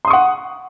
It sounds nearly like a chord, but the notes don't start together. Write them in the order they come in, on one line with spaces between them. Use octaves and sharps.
C6 D#6 C#6 F#5